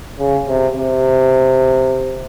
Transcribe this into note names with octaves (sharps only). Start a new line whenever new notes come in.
C#3
C3
C3